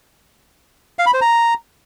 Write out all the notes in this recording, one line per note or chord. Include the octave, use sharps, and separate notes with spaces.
F5
B5
C5
A#5